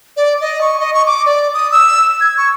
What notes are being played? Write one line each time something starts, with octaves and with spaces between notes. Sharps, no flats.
D5
D#5
C#6
D#5
C#6
D6
D5
D#6
E6
G#6
C#6